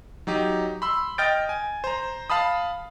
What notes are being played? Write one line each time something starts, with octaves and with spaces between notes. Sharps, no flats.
F#3 D#4 G4
B5 C6 E6
D#5 G5 F6 G6 A6 D7
G#5
C5 A#5
F5 A5 B5 D#6